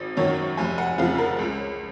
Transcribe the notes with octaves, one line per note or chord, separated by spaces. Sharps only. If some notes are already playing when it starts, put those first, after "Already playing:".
Already playing: G#1
F#2 D#3 F#3 C#5
F1 G#5
F#5
F2 C#3 F3 F5
A#4
C#2